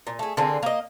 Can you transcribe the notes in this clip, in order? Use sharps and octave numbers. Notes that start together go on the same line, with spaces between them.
A#2
A3 G#4
D3 A#3 C4 G#4
A#3 D#5